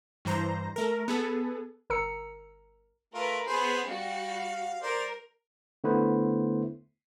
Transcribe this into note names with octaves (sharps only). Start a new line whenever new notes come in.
G2 E3 C5 A#5
A3 A#4
B3 G#4 A4
G1 A#4 A#5 E6 C#7
A3 F4 A#4 B4
B3 G#4 B4 C5
G3 F#4 F5
A#4 C5 D5
D3 A3 B3 E4 B4 C5